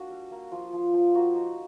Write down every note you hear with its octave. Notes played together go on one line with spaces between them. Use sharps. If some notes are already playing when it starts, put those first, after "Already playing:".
Already playing: A#3 D4 F#4
G3
A#3
F3 F4
F3
F3
A#3 F#4
D#4